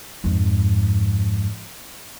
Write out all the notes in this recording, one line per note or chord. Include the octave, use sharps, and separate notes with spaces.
F2 G#2